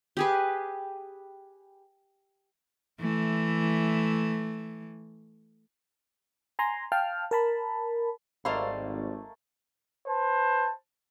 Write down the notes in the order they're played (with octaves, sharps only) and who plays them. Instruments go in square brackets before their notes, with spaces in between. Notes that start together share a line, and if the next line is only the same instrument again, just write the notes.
[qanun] G4 G#4 B4
[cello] E3 A3
[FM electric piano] G#5 A#5 C6
F5 G5 A5 F6
A#4 A5 B5
[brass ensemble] G#1 [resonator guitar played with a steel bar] G3 C5 F5 [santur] A3 A#3 [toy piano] D#5 B5
[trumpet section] B4 C5 A5